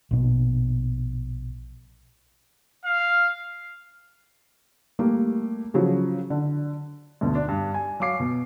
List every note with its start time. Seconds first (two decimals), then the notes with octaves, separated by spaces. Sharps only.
0.11 A#1 B2
2.85 F5
4.99 G3 A3 A#3
5.74 C#3 F3 F#3
6.30 D3
7.21 D2 B2 D3
7.35 D4
7.48 G2
7.74 G#5
8.00 F#3 F5 D6 C7
8.20 B2